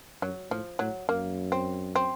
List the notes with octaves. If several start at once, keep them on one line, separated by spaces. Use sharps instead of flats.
F#2 F#3
A2 F3
A2 F#3
F#2 A#3
C4
C4